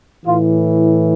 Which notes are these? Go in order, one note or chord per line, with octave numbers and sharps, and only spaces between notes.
A2 E3 F4